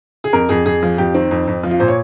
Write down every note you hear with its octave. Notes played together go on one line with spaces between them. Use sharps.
G#4
F2 A#4
F2 G#4
F2 G#4
F3
F2 G4
D#3 C4
F2
F2
F3
F4
A#2 C5
C#5